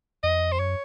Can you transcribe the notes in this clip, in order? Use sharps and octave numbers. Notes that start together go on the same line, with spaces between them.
F2 D#5
C5
F#2 C#5